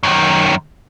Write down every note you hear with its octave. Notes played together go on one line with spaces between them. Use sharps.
F#2 D#3